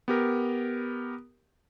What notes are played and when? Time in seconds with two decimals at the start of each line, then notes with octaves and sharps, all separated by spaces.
0.08 B3 G4 A#4